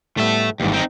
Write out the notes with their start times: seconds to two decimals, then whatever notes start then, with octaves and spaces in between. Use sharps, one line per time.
0.17 A2 G3 A3 B3 E5
0.60 G#1 D#2 G#2 E3 G3
0.73 C4 D#4